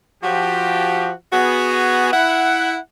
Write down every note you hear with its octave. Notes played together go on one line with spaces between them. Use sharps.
F3 F#4 G4
B3 F#4 G#4
E4 F#5